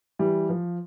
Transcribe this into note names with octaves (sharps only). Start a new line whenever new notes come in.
E3 G3
F3